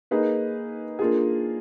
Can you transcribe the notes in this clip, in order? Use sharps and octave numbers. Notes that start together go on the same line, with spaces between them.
A#3 D#4 G#4 B4
A#3 D4 F4 G#4